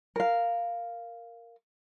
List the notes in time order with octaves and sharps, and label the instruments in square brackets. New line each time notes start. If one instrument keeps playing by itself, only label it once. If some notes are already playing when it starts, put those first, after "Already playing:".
[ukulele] A#4 F5